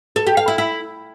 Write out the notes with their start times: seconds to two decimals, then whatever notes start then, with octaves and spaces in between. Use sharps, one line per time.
0.16 A4
0.27 G4
0.37 F5
0.48 E4
0.58 E4